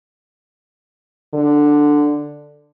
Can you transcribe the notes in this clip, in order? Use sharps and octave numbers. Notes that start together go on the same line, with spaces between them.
D3